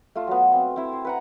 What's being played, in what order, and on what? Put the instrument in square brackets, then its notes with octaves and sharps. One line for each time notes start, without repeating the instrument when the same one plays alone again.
[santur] A3 F4
F#3 B3
C4
C4 E4
C5
B4 F#5 A#5